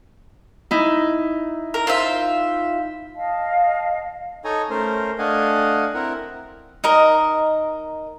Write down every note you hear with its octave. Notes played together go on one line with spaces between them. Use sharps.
D#4 E4
A#4
F4 C5 E5
D#5 F5 A5
D#4 A4 C#5 G#5 A#5
A3 C#4 A#4 C5
A3 D4 D#5 F5 F#5 G#5
C4 E4 A#4 F#5
D#4 A#4 D#5